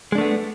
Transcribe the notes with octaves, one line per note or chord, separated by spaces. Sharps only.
G#3 A3 B3 D4